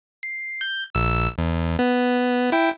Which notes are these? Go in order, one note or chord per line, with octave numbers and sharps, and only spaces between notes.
C7
G6
A#1 E6
E2
B3
E4 G5